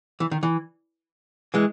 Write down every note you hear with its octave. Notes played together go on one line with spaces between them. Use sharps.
E3
D#3
E3
E3 G#3